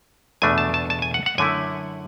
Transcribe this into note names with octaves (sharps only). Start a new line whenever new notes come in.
E2 B2 A3 D4 G#5
A5
A5
A5
G#5
F#5
F#5
F#2 D3 A3 E4 G#5